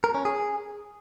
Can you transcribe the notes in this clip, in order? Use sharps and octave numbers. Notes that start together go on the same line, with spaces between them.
A#4
C#4
G#4